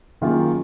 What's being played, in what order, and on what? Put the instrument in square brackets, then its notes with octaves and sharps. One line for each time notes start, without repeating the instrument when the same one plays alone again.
[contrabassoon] F#2 [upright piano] D#3 A#3 F4 G#4